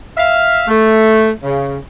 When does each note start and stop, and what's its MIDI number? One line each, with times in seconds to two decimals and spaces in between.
0.17 0.63 76
0.17 0.63 77
0.68 1.30 57
1.43 1.76 49